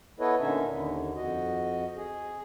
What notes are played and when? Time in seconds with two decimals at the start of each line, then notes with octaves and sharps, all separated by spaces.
0.20 B3 E4 A4 B4 C#5 D#5
0.41 A#2 D3 C#4 D#4 E5
0.70 D#2 D3
1.15 F2 F#4 D#5
1.97 G#4